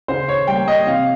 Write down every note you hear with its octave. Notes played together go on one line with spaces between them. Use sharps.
C#3 C5
C#5
G3 A#3 G5
D#5
C3 F5